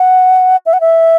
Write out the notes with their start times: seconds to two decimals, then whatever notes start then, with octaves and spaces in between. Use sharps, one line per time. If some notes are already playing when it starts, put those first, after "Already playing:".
Already playing: F#5
0.66 E5
0.73 F#5
0.81 E5